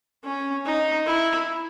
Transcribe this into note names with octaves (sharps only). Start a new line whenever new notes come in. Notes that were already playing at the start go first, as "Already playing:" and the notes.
C#4
D#4
E4